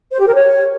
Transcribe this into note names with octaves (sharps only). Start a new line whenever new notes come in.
C5
G4
A#4
C#5